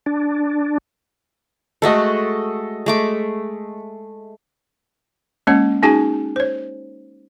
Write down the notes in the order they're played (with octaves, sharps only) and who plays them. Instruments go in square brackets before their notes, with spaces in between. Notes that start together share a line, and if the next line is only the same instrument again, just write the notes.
[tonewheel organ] D4
[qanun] G#3 A3 F#4 [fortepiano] A4 D#5
[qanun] G#3 A3 D6
[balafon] G#3 A#3 C#4 C#5 F#5
C#4 D#4 F#4 G#4 G#5 A5
C5 C#5